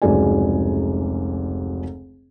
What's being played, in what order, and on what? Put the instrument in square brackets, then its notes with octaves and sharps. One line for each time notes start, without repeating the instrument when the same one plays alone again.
[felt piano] F1 C#2 G#2 F#3 D5 G#5